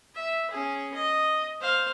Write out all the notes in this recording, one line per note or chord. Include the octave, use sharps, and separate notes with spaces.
E5
C#4 G#4
D#5
C5 F5